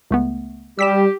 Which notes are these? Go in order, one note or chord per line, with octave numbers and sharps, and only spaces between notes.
C#2 A3 B3
G3 G4 E6 B6 E7